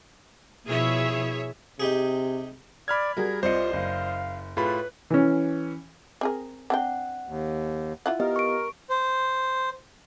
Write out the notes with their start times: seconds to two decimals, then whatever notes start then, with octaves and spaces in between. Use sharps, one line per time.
0.66 B2 F3 E4 G#4 C#5 E5
1.80 C3 D#4 G4 G#4
2.88 D5 B5 F6 G#6
3.17 G3 F#4 G#4 A#4
3.43 C2 F4 C5 D5 D#5 C#7
3.73 F#1 F5
4.57 A2 F4 G#4 B4 B5
5.10 E3 C#4
6.21 C4 G#4 A#4
6.70 C4 D4 F#5 G5
7.27 D#2
8.06 E4 F4 F#5
8.20 B3 G4 A#4 D#5
8.36 C#6 D7
8.90 C5